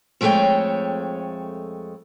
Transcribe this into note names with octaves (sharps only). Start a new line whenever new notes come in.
F2 G#3 A3 G#4 C#5 G5